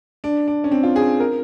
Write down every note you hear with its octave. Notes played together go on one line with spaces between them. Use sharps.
D4
D4
C#4
C4
F4
G#4
A#4